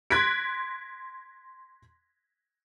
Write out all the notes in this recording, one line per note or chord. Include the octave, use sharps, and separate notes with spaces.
C6 F#6 G#6 A#6 B6 D7